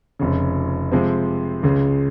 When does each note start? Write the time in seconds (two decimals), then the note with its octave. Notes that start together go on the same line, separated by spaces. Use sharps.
0.19 F1 F2 C#3
0.92 C3 F3 G#3 C4
1.63 C#2 C#3 G#3